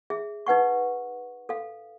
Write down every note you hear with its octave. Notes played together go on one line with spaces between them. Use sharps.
G#4 E5
D#4 B4 F#5 C#6
A4 F5